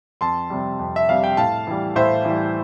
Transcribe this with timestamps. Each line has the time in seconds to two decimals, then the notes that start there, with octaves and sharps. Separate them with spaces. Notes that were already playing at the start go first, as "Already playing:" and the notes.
0.21 F2 A5 C6
0.50 C3 G3
0.79 F2
0.96 E5
1.09 C3 G3 F5
1.24 G5
1.37 A2 F5 A5
1.67 E3 G3
1.95 A2 C5 E5
2.25 E3 G3